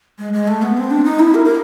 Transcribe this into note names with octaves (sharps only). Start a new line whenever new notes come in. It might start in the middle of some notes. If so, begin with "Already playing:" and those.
G#3
G#3
A3
B3
C4
D4
D#4
E4
A#4
A#4